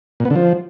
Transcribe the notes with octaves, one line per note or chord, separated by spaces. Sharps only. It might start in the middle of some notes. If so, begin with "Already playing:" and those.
A#2
B3
D3
F3